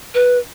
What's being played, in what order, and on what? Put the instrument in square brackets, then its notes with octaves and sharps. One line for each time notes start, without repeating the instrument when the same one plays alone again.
[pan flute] B4